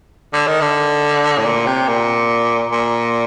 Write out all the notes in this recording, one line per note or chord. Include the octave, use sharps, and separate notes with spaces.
D3
D#3
D3
A2
A#2
C3
A#2
A#2